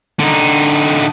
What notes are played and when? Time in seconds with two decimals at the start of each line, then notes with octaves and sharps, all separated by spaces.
0.19 D3 D#4